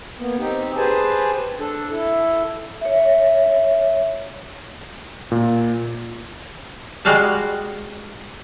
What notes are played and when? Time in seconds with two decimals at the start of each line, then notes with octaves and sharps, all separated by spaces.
0.18 A#3 B3
0.39 C4 D#4 G4
0.77 G4 G#4 B4 C5 G#5 A5
1.59 D4 A4
1.90 E4 A4
2.81 C#5 E5
5.32 A#2
7.05 G3 G#3 F#4 F5 G5 A5